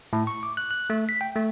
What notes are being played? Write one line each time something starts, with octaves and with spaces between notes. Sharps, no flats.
A2
C#6
D6
F#6
F#6
A3
B6
G5
A3